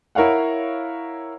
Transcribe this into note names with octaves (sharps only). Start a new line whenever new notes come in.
E4 A#4 C#5 F5 F#5